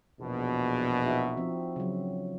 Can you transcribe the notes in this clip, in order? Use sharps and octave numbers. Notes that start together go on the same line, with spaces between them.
A#1 E2 B2
D#4 F#4 E5
F3 C4 D4
C#3 F#3